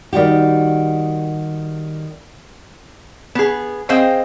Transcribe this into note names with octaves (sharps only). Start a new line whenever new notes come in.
D#3 G3 F#4 G4
B3 G#4
C4 G#4 C5 D#5 F5 G5